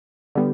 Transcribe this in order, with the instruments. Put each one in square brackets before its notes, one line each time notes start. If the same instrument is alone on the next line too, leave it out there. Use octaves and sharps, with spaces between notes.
[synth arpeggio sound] D3 G3 B3